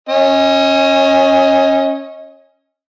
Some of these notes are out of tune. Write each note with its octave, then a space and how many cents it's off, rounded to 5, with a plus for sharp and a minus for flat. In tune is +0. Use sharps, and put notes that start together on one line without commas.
C#4 -15 D#5 +25